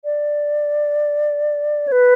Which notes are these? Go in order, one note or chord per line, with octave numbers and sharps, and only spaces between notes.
D5
C#5
B4